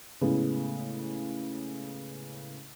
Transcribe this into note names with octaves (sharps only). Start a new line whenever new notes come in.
A2 C#3 G#3 B3